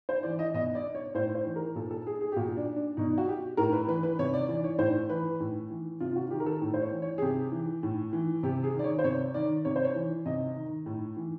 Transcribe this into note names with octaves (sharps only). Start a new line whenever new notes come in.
C5
E3 D5
D#5
B2 D#5
D5
C#5
A2 C5
C5
E3
A#4
A#2 A4
A4
G#4
G#4
G4
A#2 F#4
D4
D4
B2 D#4
F#4
G4
A2 A#4
B4
E3 B4
B4
C3 C#5
D5
E3 D5
C#5
A2 C5
E3 B4
A2
E3
C3 F4
F4
F#4
D#3 G4
A#4
A4
A2
C5
C#5
E3
C#5
G#4
C3 G4
E3
A2
E3
C3 G4
G#4
D#3 D5
C#5
C5
C3 C#5
D#3 D5
C3 C#5
C5
C#5
E3
C3 D#5
D#3
A2
E3